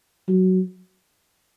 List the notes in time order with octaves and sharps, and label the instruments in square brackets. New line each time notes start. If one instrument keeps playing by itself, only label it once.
[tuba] F#3